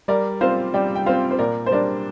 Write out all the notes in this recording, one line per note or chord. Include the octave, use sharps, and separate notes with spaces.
G3 A#4 D5
C4 F4 C5 F5
G3 D5 G5
G5
C4 F4 C5 F5
C5
A#2 A#4 D5
C5
G3 D4 A#4 D5